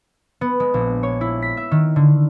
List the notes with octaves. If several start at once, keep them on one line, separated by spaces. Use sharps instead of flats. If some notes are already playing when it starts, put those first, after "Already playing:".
B3
G#3
A#1
C#5
E4
B6
E5
D#3
D3